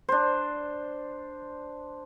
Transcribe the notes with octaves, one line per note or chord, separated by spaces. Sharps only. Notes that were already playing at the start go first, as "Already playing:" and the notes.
D4 C5